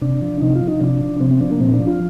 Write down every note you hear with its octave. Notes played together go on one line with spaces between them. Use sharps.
C3 D4
F3
C3 D#4
F4
F3
D#4
C3 D4
F3
C3 C4
C4
F3 D4
A#3
A#2 C4
D4
F3
F4